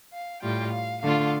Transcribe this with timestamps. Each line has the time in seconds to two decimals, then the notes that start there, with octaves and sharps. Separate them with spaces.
0.13 F5
0.42 A2 G3 F4 G5
0.73 F5
1.02 D3 A3 F4 F5